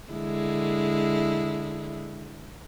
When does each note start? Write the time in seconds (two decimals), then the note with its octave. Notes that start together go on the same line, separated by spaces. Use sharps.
0.12 D3 G#3 E4